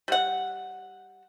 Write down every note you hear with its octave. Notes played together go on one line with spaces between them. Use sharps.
G3 F#5